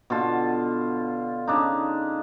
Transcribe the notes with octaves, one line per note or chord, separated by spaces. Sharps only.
B2 D3 F4 A5
C#3 D4 D#4